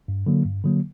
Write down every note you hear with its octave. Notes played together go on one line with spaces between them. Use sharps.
G2
D3 F#3 A#3
G2
D3 F#3 A#3